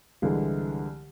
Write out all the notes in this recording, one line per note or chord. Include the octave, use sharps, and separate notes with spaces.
C2 D3 E3 G#3